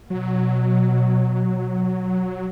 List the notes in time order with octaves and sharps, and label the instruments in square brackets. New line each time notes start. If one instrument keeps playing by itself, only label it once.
[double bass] B2 [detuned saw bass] F#3